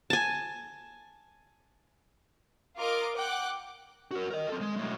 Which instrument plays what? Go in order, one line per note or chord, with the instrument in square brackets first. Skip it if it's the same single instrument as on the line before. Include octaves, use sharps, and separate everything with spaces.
[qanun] G#5 A5
[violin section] F4 A#4 D#5 D6 F6 D7
F#5 G5 D6 F#6
[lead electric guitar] F#4 A#4
A#4 D#5
C4 A4
G#3
B1 A2